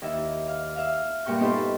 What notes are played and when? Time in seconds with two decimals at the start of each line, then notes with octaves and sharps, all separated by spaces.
0.02 D#2 D#4 E4 E5
0.48 F5
0.76 E5 F5
1.25 G2 A#2 F#4 G5 C#6 G6
1.40 B3 D#4 F4 G4 A4 C5